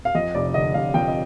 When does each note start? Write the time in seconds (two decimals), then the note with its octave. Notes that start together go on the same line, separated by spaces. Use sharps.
0.05 F5
0.15 F2 D#5
0.35 F1 D5
0.54 D3 D#5
0.74 F1 F5
0.94 F2 G5
1.08 D#5